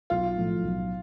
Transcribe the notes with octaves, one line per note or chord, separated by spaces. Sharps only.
B1 F4
A2 F3
B1